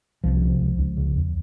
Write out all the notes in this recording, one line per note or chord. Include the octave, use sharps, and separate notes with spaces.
C2 F3
C3
C#2
C#2
C#3
E2